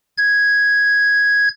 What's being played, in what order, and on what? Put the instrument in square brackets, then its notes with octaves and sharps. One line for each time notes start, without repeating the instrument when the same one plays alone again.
[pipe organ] G#6